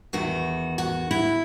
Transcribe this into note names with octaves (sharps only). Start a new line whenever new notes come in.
E2 D#3 F#4
F#4
E4